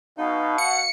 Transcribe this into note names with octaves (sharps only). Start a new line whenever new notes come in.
B2 D#4 F5
F#5 C#7